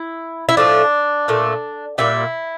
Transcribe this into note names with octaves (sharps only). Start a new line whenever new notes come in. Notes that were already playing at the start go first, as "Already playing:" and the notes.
Already playing: E4
E4
A2 F3 A3 D4
A#2 A3
A#2 G3 E4